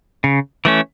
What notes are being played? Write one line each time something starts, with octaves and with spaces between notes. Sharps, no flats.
C#3
E3 A3 C#4